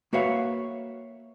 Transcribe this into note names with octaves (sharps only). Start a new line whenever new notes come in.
A#3 F#4 B4 C#5 E5 F5